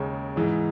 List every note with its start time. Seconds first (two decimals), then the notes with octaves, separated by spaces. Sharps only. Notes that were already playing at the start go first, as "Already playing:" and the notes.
Already playing: D#2 C#3 G#3
0.36 G#2 E3 G#3